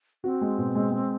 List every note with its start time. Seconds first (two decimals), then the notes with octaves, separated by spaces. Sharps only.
0.24 C4 F#4
0.41 G#3
0.58 B2
0.75 G#3
0.92 G#3